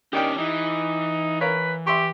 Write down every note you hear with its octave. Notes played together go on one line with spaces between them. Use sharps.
D#3 C#4 D4 G4 D5 G5
E3 D#4
A#4 B4 C#5 F5
G4 E5 C6 C#6